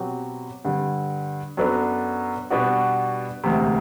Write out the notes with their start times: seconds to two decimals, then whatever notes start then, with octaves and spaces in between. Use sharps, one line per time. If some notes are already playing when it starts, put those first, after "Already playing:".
Already playing: B2 F#3 C4 G4
0.65 G2 D3 G3
1.57 F#2 F#3 B3 D4 A4
2.50 B2 G3 B3 D4 F#4
3.44 E1 D2 C3